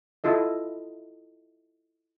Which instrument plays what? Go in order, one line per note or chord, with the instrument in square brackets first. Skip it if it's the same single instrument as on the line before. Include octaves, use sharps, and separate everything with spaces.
[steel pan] E4 F4 A4 D#5